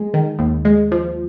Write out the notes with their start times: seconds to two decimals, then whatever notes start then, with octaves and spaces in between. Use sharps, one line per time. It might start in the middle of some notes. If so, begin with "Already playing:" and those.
Already playing: G#3
0.14 D#3
0.39 D#2
0.65 G#3
0.92 F3